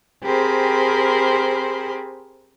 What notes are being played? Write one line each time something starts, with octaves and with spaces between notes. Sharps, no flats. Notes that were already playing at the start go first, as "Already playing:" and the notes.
C4 G4 G#4 A#4 C5 B5